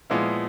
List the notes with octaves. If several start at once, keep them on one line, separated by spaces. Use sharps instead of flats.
A#2 F3 G#3 B3 E4